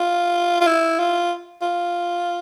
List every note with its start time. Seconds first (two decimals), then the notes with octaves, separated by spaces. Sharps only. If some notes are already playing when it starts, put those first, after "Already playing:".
Already playing: F4
0.61 F4
0.67 E4
0.99 F4
1.62 F4